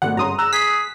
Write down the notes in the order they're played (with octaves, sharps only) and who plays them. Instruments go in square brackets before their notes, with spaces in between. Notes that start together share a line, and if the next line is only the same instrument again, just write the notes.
[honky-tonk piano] G#1 B2 A3 [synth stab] F#5
[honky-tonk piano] G1 C#4 C6 [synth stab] A#5 D#6
[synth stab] A#5 [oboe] E6 [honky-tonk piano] F#6
[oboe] G#4 [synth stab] B6